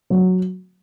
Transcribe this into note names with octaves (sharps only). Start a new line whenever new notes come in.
F#3